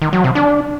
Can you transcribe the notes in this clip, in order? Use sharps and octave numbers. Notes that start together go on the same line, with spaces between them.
D#3
F#3
C3
D4